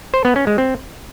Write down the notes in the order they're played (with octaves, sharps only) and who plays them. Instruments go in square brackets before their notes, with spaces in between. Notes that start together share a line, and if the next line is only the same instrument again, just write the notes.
[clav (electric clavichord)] C5
B3
C#4
G#3
C4